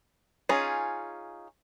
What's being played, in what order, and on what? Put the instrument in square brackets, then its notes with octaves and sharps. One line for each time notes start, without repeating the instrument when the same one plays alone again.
[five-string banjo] C#4 D#4 F4 G#4